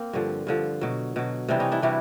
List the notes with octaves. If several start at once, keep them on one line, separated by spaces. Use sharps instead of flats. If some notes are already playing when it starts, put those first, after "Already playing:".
Already playing: A#3 C4
G2 D3 F3
G2 D3 F3
B2 F#3
B2 F#3
C3 E3 G3 C4 D4
C#4 D#4
D4 E4
C3 E3 G3 E4 F#4